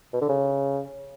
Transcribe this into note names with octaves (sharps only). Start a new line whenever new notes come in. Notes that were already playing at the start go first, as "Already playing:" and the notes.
B2
D3
C#3